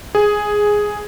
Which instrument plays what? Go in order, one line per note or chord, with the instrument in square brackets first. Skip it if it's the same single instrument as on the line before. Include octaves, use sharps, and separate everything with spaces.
[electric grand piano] G#4